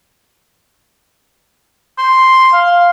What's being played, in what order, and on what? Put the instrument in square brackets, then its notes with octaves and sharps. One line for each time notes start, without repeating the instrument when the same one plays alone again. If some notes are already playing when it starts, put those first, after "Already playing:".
[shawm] C6
[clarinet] F5